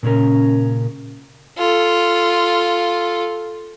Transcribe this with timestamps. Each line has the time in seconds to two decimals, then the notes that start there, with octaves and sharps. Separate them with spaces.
0.03 A#2 C#3 C#4 A#4
1.58 F4 A4